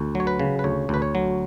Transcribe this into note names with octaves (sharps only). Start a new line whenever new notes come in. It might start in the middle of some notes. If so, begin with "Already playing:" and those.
Already playing: D2
F#3 C#5
B4
C#3
B4
D2 C#5
D2 B4
C#5
F#3